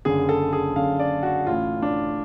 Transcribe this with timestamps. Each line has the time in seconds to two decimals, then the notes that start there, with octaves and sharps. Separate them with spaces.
0.05 F#1 F#2 D3 G#4
0.29 A4
0.53 G#4
0.76 F#1 F#2 D3 F5
1.00 D5
1.23 F#4
1.47 A1 A2 F4
1.82 D4